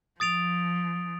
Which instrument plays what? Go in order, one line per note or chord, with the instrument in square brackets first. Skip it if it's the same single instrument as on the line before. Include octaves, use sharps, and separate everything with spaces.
[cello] F3 [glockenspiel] D#6 A6 D7 F7